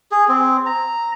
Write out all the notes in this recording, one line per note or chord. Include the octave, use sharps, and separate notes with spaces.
G#4
C4
A#5